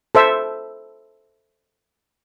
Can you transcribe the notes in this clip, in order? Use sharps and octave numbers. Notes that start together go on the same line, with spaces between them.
A4 C5 E5